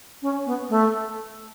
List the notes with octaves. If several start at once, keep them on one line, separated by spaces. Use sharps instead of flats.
C#4
B3
A3